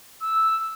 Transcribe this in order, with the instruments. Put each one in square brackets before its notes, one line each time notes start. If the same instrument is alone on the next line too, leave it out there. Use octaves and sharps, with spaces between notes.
[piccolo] E6